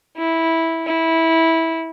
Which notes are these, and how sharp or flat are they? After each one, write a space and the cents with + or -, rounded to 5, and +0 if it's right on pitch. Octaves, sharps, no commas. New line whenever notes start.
E4 -10
E4 -15